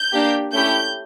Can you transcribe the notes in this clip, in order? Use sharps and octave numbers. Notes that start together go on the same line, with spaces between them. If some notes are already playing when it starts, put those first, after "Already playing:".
Already playing: G6
A#3 D4 G4
A3 C#4 E4 G4 G6